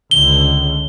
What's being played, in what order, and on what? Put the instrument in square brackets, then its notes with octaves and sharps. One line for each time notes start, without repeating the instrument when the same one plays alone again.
[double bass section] C#2 D3 [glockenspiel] G7